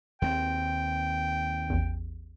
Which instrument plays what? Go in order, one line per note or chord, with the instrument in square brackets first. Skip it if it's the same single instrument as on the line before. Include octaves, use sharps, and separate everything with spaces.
[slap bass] D#2 A3 C4 [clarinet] G5
[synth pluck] A1 E2